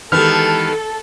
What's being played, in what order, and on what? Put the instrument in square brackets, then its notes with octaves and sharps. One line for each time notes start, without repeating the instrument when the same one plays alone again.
[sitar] D#3 B3 [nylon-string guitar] E3 G#3 G4 [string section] A4 [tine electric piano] F6